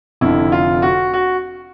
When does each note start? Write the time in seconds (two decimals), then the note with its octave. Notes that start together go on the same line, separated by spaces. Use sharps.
0.21 F1 F2 D3 E4
0.52 F4
0.82 F#4
1.14 F#4